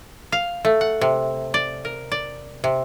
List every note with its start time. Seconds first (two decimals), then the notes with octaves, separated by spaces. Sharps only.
0.32 F5
0.65 A3
0.81 F#5
1.01 C3
1.54 D5
1.85 A#4
2.12 D5
2.64 C3